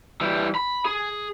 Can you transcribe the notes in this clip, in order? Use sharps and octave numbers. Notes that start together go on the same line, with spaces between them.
E3 G3
B5
G#4